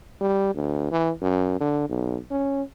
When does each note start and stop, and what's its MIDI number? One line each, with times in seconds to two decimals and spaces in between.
0.21 0.52 55
0.55 0.87 38
0.91 1.11 52
1.21 1.56 42
1.60 1.86 50
1.89 2.17 35
2.31 2.62 61